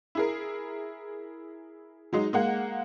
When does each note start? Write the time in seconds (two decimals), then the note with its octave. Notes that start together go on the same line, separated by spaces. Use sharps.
0.15 E4 G#4 A#4
2.13 F#3 G#3 D#4
2.33 G#3 A#3 F#5